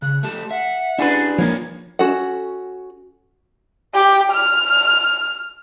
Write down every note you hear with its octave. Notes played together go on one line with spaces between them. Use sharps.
C#3 F#6
A3 G4 A5
E5 F#5
C#4 D4 E4 G#4 B4
F3 A#3 D#4 C#5 G#6
C#4 F#4 A4 F#5
G4
F6